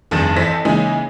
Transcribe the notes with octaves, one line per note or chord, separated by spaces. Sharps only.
F1 G2 D#3 G#4 A6 E7
A1 E3 A4 C5 A#6 B6
C#3 E3 G#3 A#3 D#4